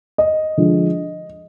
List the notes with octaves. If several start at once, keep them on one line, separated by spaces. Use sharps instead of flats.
D#5
D3 F3 G#3